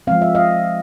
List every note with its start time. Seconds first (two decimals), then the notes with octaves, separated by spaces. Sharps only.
0.07 F3 G#3 C4 F5
0.22 E5
0.35 D#5 F5